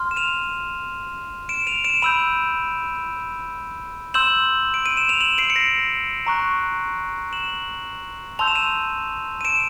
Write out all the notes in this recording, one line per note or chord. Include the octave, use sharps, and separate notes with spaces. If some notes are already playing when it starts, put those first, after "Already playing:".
Already playing: C6 F6
E7
D#7 F7
D7 E7
D#7 F7
D7 E7
B5 E6 G6 D#7 F7
C6 E6 G6 E7 F#7
D7
D#7
E7
F7
E7 F#7
C7 D7
C#7
A#6 C7
A#5 C#6 F#6
E7 F#7
A5 C6 E6 G6 F7
E7
D#7 F7
D#7
D7 E7